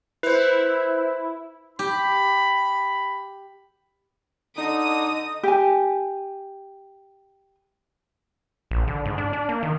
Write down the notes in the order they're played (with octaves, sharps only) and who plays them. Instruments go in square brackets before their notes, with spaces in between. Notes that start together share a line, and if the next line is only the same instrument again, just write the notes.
[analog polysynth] E4 [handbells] B4 C5
[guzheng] G4 [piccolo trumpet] B5
[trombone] D3 [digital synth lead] D#4 [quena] D#5 [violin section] D#6
[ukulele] G4 G#5
[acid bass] A#1
D3
G#2
D4
D4
A#3
D#3